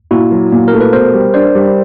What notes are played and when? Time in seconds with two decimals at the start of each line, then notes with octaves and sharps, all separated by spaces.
0.11 A#2 E4 F#4
0.31 F#3
0.52 A#2
0.68 A3 A#4
0.81 B4
0.93 B2 A#4 C5
1.14 G3
1.34 D4 C5 D5
1.55 G3